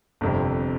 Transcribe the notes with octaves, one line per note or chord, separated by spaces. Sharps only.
G1 F2 C3